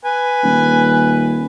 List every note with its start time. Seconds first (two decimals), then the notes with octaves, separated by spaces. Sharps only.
0.05 B4 G#5
0.44 D#1